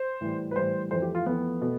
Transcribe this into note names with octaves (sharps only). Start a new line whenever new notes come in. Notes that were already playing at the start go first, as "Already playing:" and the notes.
Already playing: C5
A2 E3 G3
B4
A2 E3 G3 C5
F2 E3 A3 C5
G4
F4
F2 E3 A3 B3
B2 A3